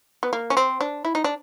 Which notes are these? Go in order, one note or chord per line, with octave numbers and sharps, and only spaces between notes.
B3
A#3
C#4
C4
D4
E4
D#4
D4